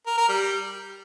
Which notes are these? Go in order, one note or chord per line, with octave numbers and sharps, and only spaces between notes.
A#4
A#4
G3